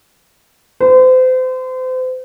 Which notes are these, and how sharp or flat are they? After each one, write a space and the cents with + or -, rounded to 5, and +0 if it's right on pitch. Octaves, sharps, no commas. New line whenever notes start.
C5 -35